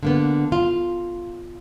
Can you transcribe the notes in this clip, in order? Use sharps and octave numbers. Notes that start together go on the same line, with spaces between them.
D3 A#3 B3
F4